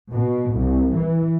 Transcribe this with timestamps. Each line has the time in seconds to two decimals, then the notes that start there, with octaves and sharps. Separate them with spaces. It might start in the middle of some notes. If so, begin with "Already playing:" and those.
0.11 B2
0.53 C2
0.96 E3